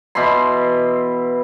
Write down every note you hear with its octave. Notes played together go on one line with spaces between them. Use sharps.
B2 E3 B5 C6